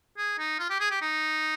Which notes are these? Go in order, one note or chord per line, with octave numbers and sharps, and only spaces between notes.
G#4
D#4
F4
G4
G#4
G4
D#4